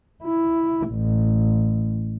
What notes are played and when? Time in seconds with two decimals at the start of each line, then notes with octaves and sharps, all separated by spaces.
0.24 E4
0.90 A1